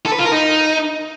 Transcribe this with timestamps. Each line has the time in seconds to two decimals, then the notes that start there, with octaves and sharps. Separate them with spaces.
0.06 A4
0.12 B4
0.19 F4
0.25 A#4
0.32 D#4